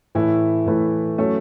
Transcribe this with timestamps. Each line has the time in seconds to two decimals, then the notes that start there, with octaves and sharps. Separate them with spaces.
0.15 A2 E3 A3 E4 B4
0.66 A2 E3 A3 E4 B4
1.18 F#3 A3 C#4